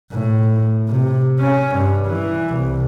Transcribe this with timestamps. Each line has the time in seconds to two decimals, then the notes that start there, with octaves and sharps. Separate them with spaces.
0.11 A2
0.88 C3
1.39 C#4
1.76 G2
2.06 E3
2.55 C2